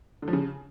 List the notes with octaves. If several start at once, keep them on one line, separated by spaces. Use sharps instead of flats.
D3
F3
C#3